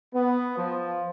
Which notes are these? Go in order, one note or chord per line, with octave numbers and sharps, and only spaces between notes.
B3
F3